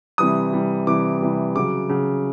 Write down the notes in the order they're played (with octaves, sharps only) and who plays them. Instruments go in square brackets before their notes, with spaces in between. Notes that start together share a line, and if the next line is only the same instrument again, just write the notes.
[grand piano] C3 E3 G3 D#6
C3 E3 G3
C3 E3 G3 D6
C3 E3 G3
C#3 F#3 D6
C#3 F#3